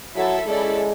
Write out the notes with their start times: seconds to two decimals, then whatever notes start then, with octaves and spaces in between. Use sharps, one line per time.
0.16 F#3 E4 A4 E5
0.46 G#3 C#4 E4 A4 D5